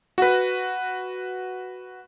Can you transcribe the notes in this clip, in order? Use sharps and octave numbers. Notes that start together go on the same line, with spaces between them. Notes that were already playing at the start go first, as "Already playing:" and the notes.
F#4 B4